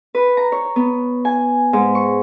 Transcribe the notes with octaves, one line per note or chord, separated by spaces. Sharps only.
B4
A#5
C#5
B3
G#5
G#2
C#6